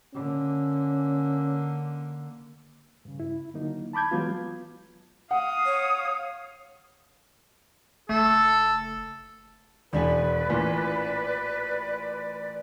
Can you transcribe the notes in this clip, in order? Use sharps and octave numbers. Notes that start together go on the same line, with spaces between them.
D3 A#3 C#4
G2 C#3
E4
D3 F#3 A#3 D#4
A5 B5 D6 G6 G#6
E3 F#3 G#3 B3 F4
F5 F#5 D#6
C#5
F#1 A3 A4
E1 D4 B4 D5 G#5
A1 A#2 E3